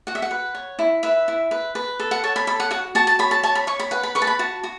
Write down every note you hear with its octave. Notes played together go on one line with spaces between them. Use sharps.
F#4 F#5
E5
F#5
B4
C#5
E4
B4 E5
E4
B4
B4
A4
F#5
C#5 A5
B5
A4 B5
F#5
F#4 F#5
F#4 A5
A5
C#5 B5
A5
C#5 A5
B5
C#5 C#6
B5
B4 F#5
B5
B4 C#6
A5
B5
F#4 A5
F#4